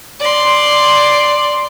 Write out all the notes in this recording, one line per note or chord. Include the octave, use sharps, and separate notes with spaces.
D5 C6